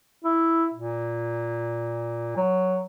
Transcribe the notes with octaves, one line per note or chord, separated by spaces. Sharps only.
E4
A#2
F#3